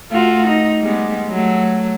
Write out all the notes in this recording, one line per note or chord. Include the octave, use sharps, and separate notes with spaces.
A3 F4 F#4
D#4
G3 G#3 B3
F#3 A3